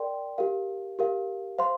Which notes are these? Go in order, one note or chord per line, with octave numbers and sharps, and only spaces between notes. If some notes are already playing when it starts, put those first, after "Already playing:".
Already playing: A#4 D5 G5 C6
G4 A#4 F5
G4 A#4 F5
C5 F5 C6